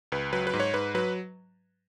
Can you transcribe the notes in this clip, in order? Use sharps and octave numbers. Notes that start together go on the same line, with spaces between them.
C#2 B4
F#3 B4
B4
G#2
C#5
G#2 B4
F#3 B4